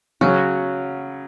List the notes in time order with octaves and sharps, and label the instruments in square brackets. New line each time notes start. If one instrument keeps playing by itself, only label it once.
[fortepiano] C#3 F#3 C#4 [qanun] F#4